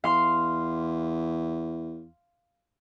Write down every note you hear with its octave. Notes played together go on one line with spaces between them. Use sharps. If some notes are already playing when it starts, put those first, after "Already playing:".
E2 F5 C6